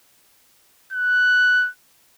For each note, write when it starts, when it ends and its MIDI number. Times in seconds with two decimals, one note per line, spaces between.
0.93 1.69 90